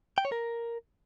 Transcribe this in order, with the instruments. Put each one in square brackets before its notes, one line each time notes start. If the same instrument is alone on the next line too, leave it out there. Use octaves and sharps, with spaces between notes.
[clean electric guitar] G5
C#5
A#4